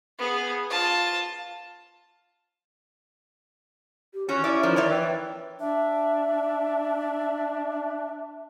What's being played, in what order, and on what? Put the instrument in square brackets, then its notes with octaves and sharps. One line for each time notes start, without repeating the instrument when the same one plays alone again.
[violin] B3 G#4
F4 A5
[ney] G4
[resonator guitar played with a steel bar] E2 F#4 [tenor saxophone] C#4 [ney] C#5
[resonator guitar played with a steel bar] E4 D5
[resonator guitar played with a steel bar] F3 [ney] D#4 [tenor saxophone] A#4
[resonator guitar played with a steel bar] E2 C#5 D5 [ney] E5
[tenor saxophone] E3 [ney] G5
[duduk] D4 [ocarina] E5